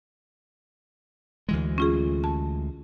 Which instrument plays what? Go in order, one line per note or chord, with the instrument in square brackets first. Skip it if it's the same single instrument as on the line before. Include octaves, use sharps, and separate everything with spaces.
[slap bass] D2 E3 G#3
[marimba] C#4 F4 G#4
A5